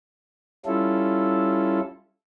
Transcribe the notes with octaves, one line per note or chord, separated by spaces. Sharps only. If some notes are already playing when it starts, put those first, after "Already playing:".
G3 C#4 E4 F4 A4